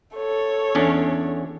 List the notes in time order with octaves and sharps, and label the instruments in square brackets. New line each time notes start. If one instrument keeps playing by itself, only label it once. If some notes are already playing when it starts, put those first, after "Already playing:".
[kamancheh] A4 C#5
[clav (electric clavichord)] E2 C#4 D4